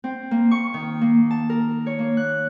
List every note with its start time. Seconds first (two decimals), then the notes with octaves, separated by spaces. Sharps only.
0.04 C4
0.31 A#3
0.51 C#6
0.74 D#3
1.02 A#3
1.31 A5
1.50 A#4
1.86 C#5
1.99 A#3
2.17 F#6